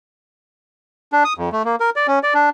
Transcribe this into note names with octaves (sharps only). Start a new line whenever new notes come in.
D4
D#6
F2
A3
A#3
A#4
D5
C#4
D5
D4